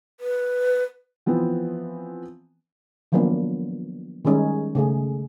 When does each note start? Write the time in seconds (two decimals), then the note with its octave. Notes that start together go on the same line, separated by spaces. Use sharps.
0.20 B4
1.26 E3 F3 B3 C4
3.12 D#3 F3 F#3 A#3 B3 D4
4.25 D#3 G3 G#3 C#4 D#4
4.75 C#3 A3 G#4